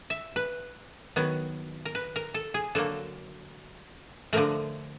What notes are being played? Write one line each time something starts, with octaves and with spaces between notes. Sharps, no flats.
E5
B4
D#3 F#3 B3
A#4
B4
A#4
A4
G#4
D3 F#3 A#3 A4
D3 F3 A3 A#4